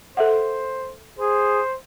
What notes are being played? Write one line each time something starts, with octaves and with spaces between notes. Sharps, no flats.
A4 C5 E5 F#5
G#4 C5